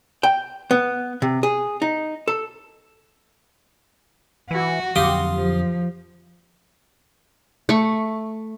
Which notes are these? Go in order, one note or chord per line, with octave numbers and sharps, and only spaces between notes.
G5
B3
C3
G#4
D#4
A4
E3 F#4
F2 D3 F#3 F4 G4 C6 D#6
F3
A3 C#6